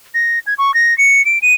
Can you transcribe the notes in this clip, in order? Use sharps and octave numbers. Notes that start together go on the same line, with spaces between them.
A#6
G#6
C#6
A#6
C#7
D7
D#7